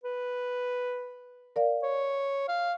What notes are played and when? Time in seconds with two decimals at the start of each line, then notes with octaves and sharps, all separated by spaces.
0.04 B4
1.56 A#4 D5 F5
1.83 C#5
2.48 F5